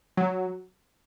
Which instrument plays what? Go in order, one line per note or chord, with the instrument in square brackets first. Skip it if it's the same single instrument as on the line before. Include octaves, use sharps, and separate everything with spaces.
[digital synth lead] F#3